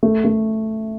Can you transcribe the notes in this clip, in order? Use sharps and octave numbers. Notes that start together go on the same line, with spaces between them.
A3
A3